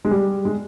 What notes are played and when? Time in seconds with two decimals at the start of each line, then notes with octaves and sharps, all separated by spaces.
0.05 G#3
0.11 G3
0.45 G#3